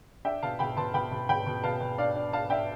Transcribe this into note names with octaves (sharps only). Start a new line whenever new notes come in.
D4 E5 G5
B2 F5 A5
B2 G5 B5
B2 A5 C6
B2 G5 B5
B2
B2 G5 B5
B2
B2 F5 A5
B2
D4 D5 F5
D4
D4 F5 A5
D4 E5 G5